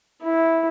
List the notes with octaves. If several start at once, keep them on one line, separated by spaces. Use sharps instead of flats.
E4